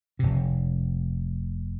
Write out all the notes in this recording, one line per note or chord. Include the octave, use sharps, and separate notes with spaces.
F1 C3